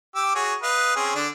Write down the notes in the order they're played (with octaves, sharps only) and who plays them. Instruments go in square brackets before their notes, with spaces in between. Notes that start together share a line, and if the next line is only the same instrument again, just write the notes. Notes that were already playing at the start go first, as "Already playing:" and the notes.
[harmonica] G4 D6 E6
F#4 G#4 C#5
B4 D#5 F5
C4 C#4 G#4
D3 D4